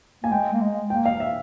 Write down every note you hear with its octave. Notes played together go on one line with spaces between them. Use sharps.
A#3 G#5
G#3 G5
A#3
G#3
A#3 G5
F5
E5